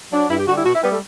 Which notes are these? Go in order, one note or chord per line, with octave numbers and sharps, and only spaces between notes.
F#3 D4
G2 E4
G4
D3 G3 F#4
E4
B2 F#4
E4
G3 B3
A3